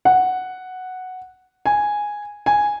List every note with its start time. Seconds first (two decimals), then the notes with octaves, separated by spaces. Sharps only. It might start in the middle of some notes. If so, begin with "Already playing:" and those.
0.05 F#5
1.66 G#5
2.46 G#5